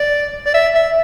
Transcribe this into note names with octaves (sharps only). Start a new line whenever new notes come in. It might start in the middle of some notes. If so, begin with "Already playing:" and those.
Already playing: D5
D5
E5
E5